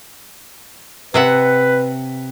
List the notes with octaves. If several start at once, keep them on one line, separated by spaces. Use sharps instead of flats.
C3 B4 E5 F#5